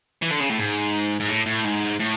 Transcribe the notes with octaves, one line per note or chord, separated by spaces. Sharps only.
E3
D3
C#3
A2
G#2
G#2
A2
A2
G#2
A2